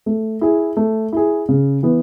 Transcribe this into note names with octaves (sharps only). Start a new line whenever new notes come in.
A3
E4 G#4
A3
E4 G#4
C#3
E3 B3